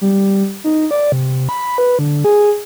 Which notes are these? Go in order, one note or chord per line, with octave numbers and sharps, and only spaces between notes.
G3
D#4
D5
C3
B5
B4
D3
G#4